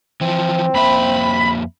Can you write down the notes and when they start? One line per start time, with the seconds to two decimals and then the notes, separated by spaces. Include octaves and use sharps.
0.21 E3 F3 C4
0.75 F2 A#3 E5 B5